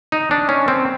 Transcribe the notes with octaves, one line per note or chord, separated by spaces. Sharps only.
D#4
D4
C#4
C4